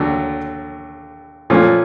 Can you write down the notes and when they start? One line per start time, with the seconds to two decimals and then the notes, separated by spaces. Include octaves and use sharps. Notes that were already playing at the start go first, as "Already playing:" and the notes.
Already playing: D#2 D3 F#3 A3
1.50 A#2 F3 A3 C#4